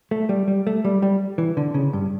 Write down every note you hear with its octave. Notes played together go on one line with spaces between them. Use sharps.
A3
G3
G3
A3
G3
G3
E3
D3
C#3
G2